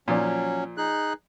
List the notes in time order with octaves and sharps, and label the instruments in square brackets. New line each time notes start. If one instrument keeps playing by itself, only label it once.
[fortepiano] A#2 F3 [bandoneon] F#3 C#4
[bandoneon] D#4 G#4 F#6